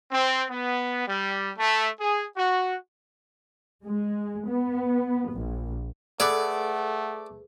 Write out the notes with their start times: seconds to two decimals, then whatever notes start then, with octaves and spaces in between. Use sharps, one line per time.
0.12 C4
0.51 B3
1.07 G3
1.58 A3
2.01 G#4
2.37 F#4
3.84 G#3
4.48 B3
5.32 A#1
6.20 A3 G#4 A4 B4 D5 F#5